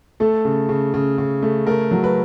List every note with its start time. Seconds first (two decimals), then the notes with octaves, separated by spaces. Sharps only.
0.20 A3 A4
0.45 C#3
0.69 C#3
0.94 C#3
1.18 C#3
1.43 A3
1.67 A3 A#4
1.91 F#3
2.04 B4